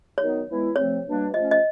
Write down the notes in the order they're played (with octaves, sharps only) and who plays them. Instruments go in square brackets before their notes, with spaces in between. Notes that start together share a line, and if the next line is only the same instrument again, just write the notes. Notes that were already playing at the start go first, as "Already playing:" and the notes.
[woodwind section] D#3 F#3 B3 D#4 [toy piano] C#5
[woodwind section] E3 G#3 B3 E4
[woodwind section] C3 F3 A3 C4 [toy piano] C#5
[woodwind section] B2 G3 A#3 D4
[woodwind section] F3 A3 C#4 [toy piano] D#5
[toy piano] D#5